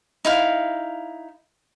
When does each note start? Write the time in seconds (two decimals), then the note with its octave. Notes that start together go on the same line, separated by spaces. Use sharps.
0.25 D#4 E4 F5